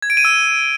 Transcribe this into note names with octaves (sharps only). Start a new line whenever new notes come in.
G#6
D7
D#7
E6